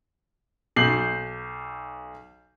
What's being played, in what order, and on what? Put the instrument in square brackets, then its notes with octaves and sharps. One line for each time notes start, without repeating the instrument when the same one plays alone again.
[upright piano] B1 G6 C7 F#7